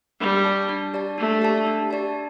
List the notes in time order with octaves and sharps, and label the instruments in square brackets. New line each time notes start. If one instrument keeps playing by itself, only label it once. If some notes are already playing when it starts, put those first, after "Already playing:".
[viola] G3 [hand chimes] D4
[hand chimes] G4 D5 A5
D4
G4 D5 A5
[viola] A3 [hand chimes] D4
[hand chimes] G4 D5 A5
D4
G4 D5 A5